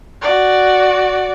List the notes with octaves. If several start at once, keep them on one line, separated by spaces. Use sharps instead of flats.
F#4 D5